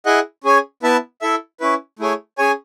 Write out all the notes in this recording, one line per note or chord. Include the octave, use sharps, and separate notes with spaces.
E4 G#4 D#5 F#5
C#4 G#4 C#5 G#5
B3 E4 B4 E5 A5
E4 A4 E5
C#4 E4 B4
A3 E4 G#4 C#5
C#4 G#4 C#5 G#5